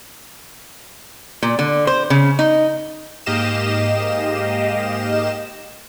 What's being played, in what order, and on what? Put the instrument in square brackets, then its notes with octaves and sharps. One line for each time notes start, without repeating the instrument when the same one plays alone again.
[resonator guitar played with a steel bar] A#2
D3
C5
C#3
D#4
[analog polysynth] G#2 A#3 G4 D#5 F5 E7